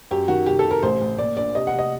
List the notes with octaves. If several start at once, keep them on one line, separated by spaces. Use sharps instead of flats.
F#2 G4
D#3 F#4
C3 G4
A4
C3
A#4
A1 C5
A1
A#2 D5
A#1 D5
C3 D#5
F#5
C3 D#5